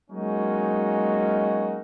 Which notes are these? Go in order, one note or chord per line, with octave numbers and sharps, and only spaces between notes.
F#3 G#3 A#3 C#4 D#4 F#4